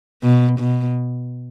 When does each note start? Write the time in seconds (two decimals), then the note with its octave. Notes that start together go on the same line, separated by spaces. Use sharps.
0.23 B2
0.60 B2